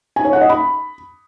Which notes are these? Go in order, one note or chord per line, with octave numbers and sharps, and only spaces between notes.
G#5
C#5
F#5
D#5
B5